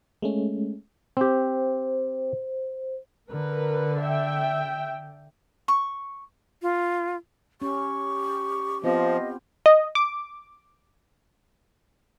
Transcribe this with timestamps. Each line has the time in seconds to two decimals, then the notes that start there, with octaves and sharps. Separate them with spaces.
0.22 G#3 A3 C#4
1.17 C4 G4 C5
3.31 D3 A#4 B4
4.01 E5 G5
5.68 C#6
6.62 F4
7.62 C#4 G4 C#6
8.84 F3 B3 C4 F4 D#5
9.66 D#5
9.95 D6